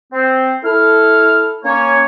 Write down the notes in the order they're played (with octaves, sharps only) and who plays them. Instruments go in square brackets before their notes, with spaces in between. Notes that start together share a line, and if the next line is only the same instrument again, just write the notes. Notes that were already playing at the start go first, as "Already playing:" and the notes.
[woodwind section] C4
[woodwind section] E4 F6 [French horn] A4
[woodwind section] A#3 C#5 [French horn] C#4